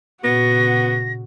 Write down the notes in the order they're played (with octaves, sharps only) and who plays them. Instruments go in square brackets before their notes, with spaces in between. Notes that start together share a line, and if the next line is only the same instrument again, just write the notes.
[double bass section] A#2 C#3 [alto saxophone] B3 [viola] F#4 [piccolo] A#6